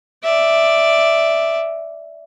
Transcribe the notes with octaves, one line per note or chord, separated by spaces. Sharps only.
D5 E5